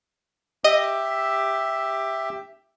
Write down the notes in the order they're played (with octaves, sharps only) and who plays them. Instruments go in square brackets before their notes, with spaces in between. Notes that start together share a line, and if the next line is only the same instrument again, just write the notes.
[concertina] G4 E5 [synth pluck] D#5